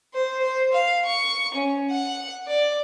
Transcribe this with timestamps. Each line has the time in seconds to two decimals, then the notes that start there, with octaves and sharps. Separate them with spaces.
0.14 C5
0.44 C5
0.73 F5
1.05 C#6
1.54 C#4
1.90 F#5
2.47 D5